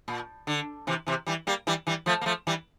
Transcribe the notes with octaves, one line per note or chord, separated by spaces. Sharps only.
A#2
D3
C3 E3
C3 E3
E3 G3
G3 A#3
E3 G3
E3 G3
F3 A3
A#3
F3 A3
E3 G3